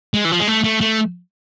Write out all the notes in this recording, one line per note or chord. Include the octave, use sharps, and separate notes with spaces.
G#3
E3
F3
G#3
A3
A3
A3